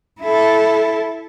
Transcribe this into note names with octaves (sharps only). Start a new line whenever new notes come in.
E4 A4